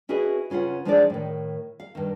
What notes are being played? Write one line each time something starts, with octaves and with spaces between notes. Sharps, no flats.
C#4 E4 F#4 G#4 B4 D#5
C#3 C#4 F4 B4 F#5
F3 G#3 D4 D#4 G#4 D5
A2 D#3
F5
G2 D#3